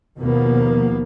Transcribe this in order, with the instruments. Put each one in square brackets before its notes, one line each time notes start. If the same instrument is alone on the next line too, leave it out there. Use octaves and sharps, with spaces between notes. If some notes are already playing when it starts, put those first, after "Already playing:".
[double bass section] D#2 B2 F3 A#3 B3